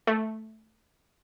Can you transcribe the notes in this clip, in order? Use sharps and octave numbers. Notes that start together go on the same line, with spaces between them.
A3